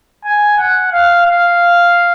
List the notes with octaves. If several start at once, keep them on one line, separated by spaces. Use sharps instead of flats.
G#5
F#5
F5
F5